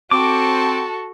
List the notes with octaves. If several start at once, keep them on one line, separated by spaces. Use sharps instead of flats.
C4 F#4 A4 A5 D6